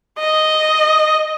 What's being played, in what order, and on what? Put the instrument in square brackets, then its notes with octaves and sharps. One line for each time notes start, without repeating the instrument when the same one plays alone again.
[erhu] D#5